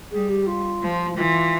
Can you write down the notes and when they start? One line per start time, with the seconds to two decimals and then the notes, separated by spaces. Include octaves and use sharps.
0.11 G3 G#4
0.29 G4
0.46 F4
0.82 F3
1.17 E3 F4